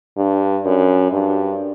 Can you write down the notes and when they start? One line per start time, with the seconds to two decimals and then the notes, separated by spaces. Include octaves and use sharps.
0.17 G2
0.65 F#2
1.12 G2